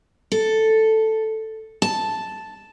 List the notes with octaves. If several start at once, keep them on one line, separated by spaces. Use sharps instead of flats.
A4
A5